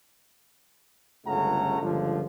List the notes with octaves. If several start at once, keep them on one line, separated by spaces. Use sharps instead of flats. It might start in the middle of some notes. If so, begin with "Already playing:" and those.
G1 C#2 C#3 A3 F#5 A#5
G1 C#2 D3 F3